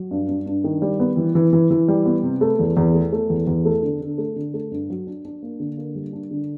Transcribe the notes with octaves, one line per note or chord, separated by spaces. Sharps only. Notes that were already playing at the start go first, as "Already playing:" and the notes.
Already playing: F#3
G2
G2
G2
D#3
G3
B3
E3
E3
E3
E3
G3
B3
C3
A3
E2
E2
A3
A3
E2
E2
A3
D3
D3
A3
D3
A3
G2
F#3
D4
D4
A#3
D3
A#3
G3
D4
D3